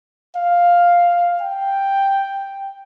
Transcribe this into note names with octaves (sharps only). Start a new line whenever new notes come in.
F5
G5